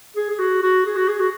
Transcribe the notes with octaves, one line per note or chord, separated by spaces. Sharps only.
G#4
G#4
F#4
F#4
G#4
F#4
G#4
F#4